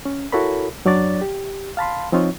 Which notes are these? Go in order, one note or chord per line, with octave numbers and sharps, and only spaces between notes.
C#4
E4 F#4 A4 A#4 C#5 B5
F#2 F#3 D4 C#5 D5 A6
G4
F5 A5 B5 C6
F3 C4 D#4 F4 C#5